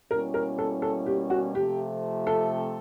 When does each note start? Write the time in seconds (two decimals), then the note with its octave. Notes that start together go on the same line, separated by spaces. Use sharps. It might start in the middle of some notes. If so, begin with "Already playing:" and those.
0.10 B2 G3 A#3 C#4 E4 A#4
0.34 A#4
0.59 A4
0.82 A4
1.06 G4
1.30 F#4
1.54 C3 F3 A3 G4
2.27 A4